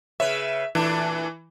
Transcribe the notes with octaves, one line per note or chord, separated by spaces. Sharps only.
C#3 B4 C#5 E5
A#2 E3 A3 D4